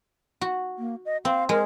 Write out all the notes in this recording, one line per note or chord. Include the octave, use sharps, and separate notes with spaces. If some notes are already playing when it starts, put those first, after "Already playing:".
F#4
A#3
D#5
C4 F5
G#3 A#4